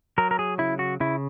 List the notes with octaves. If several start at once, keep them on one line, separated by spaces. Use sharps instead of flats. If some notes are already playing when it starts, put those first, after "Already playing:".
F#3 A#4
A#4
G#4
C#3 E4
F#4
C#3 E4